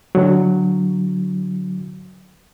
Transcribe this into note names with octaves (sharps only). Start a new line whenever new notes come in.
D3 F#3